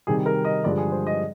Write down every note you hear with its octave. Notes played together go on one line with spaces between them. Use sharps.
C3 D#3 G3 G#4
A#4
D#5
G2 D3 F3 G#3 D5
G#4
C5
D#5